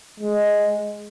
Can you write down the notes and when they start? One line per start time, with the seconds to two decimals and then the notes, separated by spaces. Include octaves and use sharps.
0.20 G#3